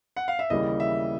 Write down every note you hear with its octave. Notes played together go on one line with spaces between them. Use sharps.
F#5
F5
E5
D#2 C#3 E3 G3 D#5
E5